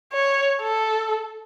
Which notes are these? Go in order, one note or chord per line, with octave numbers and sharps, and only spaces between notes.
C#5
A4